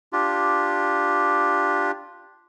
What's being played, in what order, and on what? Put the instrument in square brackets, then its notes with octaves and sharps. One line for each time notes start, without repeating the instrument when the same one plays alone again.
[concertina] D4 F4 G4